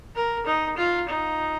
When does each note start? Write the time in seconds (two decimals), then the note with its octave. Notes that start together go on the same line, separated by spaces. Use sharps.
0.16 A#4
0.46 D#4
0.77 F4
1.08 D#4